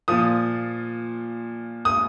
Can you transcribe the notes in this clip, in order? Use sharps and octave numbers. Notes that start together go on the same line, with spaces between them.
A#2 F3 D#6
D#6